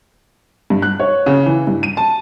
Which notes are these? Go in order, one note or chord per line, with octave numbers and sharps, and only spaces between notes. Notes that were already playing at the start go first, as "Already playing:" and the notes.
G2
F#6
C#5
C#3
E3
G2
D#7
A5